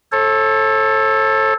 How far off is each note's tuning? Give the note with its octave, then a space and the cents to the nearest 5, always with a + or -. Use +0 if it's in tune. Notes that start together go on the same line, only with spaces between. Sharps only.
A4 +0 C#5 -45